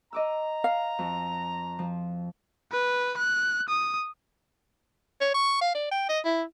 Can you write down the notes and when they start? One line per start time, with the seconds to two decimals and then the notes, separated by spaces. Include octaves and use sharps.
0.13 D#5 A#5 D6 E6
0.64 F5
0.99 F2
1.79 F3
2.72 B4
3.18 F#6
3.69 D#6
5.21 C#5
5.34 C#6
5.61 F5
5.75 D5
5.91 G5
6.09 D#5
6.25 E4